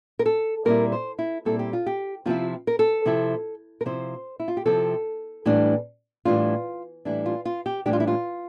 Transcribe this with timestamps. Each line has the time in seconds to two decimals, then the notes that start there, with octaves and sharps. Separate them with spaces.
0.19 A#4
0.26 A4
0.65 A#2 G3 C4 E4 A#4
0.92 C5
1.19 E4
1.45 A#2 G3 C4 E4 A4
1.59 G4
1.73 F4
1.86 G4
2.26 C3 F3 C4 E4 F4
2.67 A#4
2.79 A4
3.05 C3 F3 C4 E4
3.81 A#4
3.85 C3 F3 C4 E4 C5
4.40 E4
4.48 F4
4.57 G4
4.65 C3 F3 C4 E4 A4
5.46 A2 E3 G3 D4
6.25 A2 E3 G3 D4 F4
7.05 A2 E3 G3 D4 E4
7.26 F4
7.45 F4
7.66 G4
7.86 A2 E3 G3 D4 G4
7.93 F4
8.00 E4
8.08 F4